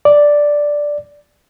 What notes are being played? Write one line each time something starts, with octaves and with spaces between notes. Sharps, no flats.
D5